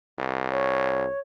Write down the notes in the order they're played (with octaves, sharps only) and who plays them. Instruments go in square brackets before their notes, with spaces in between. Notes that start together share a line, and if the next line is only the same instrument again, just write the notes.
[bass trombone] C2
[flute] C#5